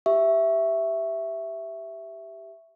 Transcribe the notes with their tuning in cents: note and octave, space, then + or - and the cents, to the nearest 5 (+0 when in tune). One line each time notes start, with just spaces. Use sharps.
G4 +0 E5 +0 C#6 +0